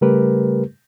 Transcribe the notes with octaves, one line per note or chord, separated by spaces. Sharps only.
C#3 G3 A3 G4 A#4 B4